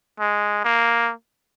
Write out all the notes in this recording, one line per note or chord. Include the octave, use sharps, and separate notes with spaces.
G#3
A#3